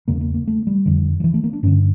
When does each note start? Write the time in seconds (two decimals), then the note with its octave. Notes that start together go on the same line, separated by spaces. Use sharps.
0.08 E2 C#3 A#3
0.21 A#3
0.34 A#3
0.47 A3
0.67 G3
0.86 F2 D3
1.20 F3
1.24 E3
1.34 A3
1.44 A#3
1.53 D4
1.63 G2 D3 C#4